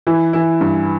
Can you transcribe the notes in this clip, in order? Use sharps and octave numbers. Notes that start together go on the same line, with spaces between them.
E3 E4
E3 E4
G2